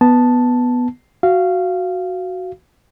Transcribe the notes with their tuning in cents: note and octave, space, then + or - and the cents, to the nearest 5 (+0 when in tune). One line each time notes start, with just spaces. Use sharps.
B3 +0 A5 +0
F#4 +0 F5 -15